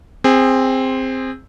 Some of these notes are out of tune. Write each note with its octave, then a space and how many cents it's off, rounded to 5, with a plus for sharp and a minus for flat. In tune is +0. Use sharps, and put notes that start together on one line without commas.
C4 +0 G#4 -20